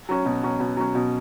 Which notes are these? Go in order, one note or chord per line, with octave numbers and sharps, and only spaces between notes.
F#3 C#4
B2
F#3 C#4
B2
F#3 C#4
B2